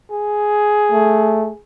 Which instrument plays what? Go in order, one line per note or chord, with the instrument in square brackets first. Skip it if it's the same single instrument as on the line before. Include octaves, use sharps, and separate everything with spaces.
[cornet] G#4
[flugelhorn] A3